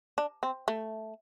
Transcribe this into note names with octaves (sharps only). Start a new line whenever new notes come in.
D4
C4
A3